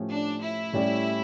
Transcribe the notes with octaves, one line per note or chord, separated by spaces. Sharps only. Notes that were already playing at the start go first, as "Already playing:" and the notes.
Already playing: A2 F3 C#4 G4
D4
E4
A2 G3 C#4 G4 D5